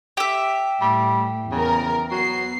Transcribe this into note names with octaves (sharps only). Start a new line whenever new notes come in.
G4 E5
A2 G3
E2 C#3 A#4
F#3 B3 C7